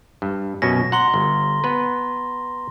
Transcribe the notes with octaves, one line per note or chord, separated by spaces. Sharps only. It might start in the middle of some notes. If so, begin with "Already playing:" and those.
G2
F#2 B2 C#4 A#6
F#5 A#5 C6 G7
G1
B3 B4